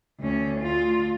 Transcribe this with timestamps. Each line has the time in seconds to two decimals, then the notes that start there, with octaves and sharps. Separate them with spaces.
0.20 D2 C#4
0.61 D2 F4